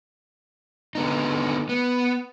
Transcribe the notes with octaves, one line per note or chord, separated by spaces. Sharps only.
D3 B3 D#4
B3